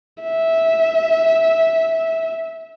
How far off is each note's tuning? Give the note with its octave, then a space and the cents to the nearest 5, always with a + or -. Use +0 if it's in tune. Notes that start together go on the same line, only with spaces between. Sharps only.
E5 -15